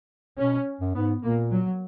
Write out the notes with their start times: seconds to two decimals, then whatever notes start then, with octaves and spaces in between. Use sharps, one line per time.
0.38 B2 C#4
0.81 F#2
0.95 G#2 B3
1.23 A#2 A#3
1.51 F#3